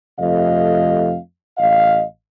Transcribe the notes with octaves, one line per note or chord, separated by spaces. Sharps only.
F2 C3 A3 D#5 F5
A1 D#5 F5